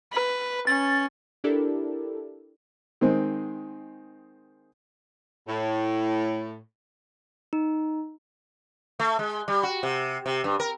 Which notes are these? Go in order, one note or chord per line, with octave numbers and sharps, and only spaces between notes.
B4
C#4 A6
D4 E4 G4 A4 A#4 D5
D#3 G#3 C4
A2
D#4
A3
G#3
G3
F#4
C3
C3
G2
A#4